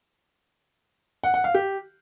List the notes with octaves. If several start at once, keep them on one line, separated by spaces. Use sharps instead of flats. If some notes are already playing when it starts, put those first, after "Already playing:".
F#5
F#5
F5
G4